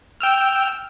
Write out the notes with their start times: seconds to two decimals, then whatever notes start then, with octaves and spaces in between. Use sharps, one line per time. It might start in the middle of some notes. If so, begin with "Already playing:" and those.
0.20 G5 E6 F6